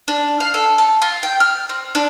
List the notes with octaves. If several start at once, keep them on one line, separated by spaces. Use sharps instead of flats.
D4
F5
A4
A5
F4
G5
F6
C4
D4